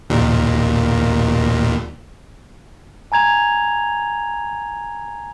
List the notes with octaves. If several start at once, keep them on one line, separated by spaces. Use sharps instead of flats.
D#2 A#2
G#5 A#5 G#6 F7